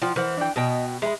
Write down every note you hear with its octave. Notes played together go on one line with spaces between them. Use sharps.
F3 F4 F#5 G5
E3 A#4 C5 F#5
D4 G5
B2 D#5 G5
G#3 E5 B5